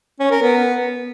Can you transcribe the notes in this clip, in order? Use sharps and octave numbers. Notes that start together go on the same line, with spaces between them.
C#4
A#4
B3